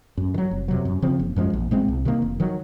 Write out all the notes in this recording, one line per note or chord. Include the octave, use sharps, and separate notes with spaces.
F#2
D#3
F#3
F1
F2 C3 F#3
F#2
C#3 F3 C4
F#1
F#2 F3 G#3
A#1
A#2 G#3 C4
C2
C3 D#3 A#3
F1
D#3 F#3